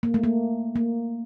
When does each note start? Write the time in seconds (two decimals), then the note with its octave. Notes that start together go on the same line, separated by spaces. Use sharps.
0.03 A#3
0.14 A3
0.24 A#3
0.76 A#3